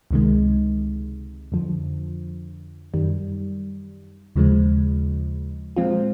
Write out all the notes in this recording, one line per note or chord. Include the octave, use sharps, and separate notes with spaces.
C#2 C3 D#3 G#3
F2 D3 F3
F#2 D#3 G3
D#2 C#3 F3 G#3
A#2 F3 G#3 C4 F4